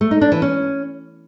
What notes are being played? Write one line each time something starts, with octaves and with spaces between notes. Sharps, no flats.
A3
D#4
D4
E3
C#4